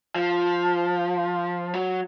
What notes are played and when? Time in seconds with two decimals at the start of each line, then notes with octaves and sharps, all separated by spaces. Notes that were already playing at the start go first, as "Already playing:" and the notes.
0.16 F3
1.74 F#3